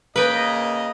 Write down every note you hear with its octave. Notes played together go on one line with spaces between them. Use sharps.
C#3 A#3 B4 D#5 G5